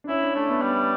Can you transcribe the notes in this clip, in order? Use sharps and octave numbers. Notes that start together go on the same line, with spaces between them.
D4
C#4 E4
D4
A3 D4
B3
G3